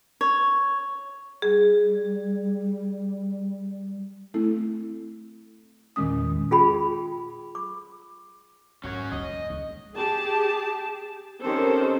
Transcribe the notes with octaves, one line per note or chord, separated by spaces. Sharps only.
C#5
G3 G#4
A3 C4 E4 A4
E2 A#2 D#3 G#3 C#4 D#6
F4 G#4 G5 B5
D6
G#2 C#4 F#4 C#5
D#1 F2 D#5
F#3
C#2
G4 G#4 A5
D#3 C4 C#4 G4 A4 C5